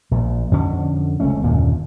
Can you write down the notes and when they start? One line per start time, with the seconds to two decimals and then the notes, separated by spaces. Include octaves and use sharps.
0.11 A#1 A#2
0.52 F2 D3 C#4
1.20 F1 C#2 A3 C#4
1.42 F#1 D#2 A#2 D3